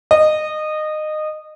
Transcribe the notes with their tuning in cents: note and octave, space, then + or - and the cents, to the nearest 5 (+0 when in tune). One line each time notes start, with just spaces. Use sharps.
D#5 -20